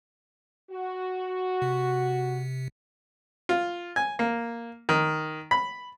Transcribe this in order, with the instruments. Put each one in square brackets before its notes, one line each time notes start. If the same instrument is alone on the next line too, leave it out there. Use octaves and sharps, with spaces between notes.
[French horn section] F#4
[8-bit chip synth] C3
[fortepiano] F4
G#5
A#3
D#3
B5